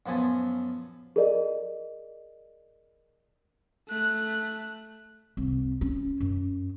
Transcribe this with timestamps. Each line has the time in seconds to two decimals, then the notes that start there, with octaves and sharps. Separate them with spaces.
0.06 F#2 F3 B3 G#5 A5
1.16 G#4 A#4 D5 D#5
3.88 A3 F#6
5.37 C2
5.81 C#4
6.20 F#2